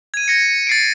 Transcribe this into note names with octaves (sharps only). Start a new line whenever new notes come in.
G#6 D#7
G#6 A#6 C#7
A6 C7 D7